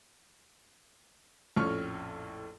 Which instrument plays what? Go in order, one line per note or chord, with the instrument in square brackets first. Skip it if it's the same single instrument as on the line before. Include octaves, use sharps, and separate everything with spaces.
[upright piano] A#1 F2 A2 C#4 C#6 F6